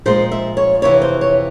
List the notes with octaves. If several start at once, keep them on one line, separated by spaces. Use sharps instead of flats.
A#2 F3 G#3 C5
E5
C#5
F2 C3 E3 C#5
C5
C#5